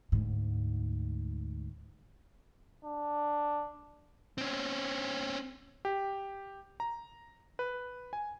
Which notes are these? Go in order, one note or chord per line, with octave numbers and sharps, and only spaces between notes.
D2 G#2
D4
C4 C#4
G4
A#5
B4
G#5